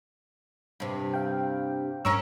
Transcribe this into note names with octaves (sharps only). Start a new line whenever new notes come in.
G2 C3
F5 G5
G2 C#4 A#4 C#5 C#6 E6